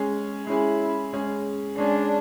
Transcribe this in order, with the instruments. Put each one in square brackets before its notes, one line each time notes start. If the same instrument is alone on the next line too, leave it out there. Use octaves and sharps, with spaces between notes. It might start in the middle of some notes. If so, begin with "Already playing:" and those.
Already playing: [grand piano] G#3 C#4 G#4
[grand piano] G#3 C#4 G#4 [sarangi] E4
[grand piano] G#3 C#4 G#4
[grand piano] G#3 C#4 G#4 [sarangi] D4